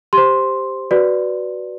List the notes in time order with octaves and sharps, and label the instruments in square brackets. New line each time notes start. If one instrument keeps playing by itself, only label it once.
[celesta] G4 C5 C6
F#4 B4 D5